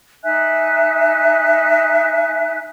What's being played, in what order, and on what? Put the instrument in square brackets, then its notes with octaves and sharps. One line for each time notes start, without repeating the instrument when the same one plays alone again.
[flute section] D#4 E5 G#5 F#6